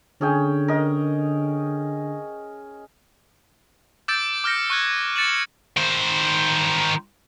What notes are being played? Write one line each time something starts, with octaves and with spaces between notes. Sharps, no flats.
D3 C#4 G#4 G5
A#4 D#5
D6 E6 G6 A6 D7
D6 F6 G6 A#6 C#7
C#6 F#6 G#6
A6 C#7 E7 F#7
D#3 C5